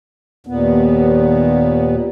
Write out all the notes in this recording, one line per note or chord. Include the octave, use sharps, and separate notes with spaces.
D#2 A#2 B3